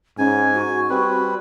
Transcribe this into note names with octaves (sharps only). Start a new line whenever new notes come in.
G#2 C#4 G#5
F#4
G3 C4 B4